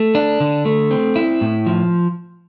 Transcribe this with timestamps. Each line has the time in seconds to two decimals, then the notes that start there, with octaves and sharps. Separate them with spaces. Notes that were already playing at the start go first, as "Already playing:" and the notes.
Already playing: A3
0.15 D4
0.40 D3
0.65 A3
0.91 C4
1.16 E4
1.41 A2
1.66 F3